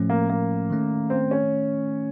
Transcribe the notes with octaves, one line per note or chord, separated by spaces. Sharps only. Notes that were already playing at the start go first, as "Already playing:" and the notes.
Already playing: A2 F3 A3 C#4
A#3
A#3
D#3 A3 C#4
C4
C#4